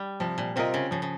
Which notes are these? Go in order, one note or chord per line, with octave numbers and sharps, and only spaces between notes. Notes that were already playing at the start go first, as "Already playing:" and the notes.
Already playing: G3
C3 F3
A#2
C3 C4 F4 A#4 D#5
C#3
C#3 F3
C#3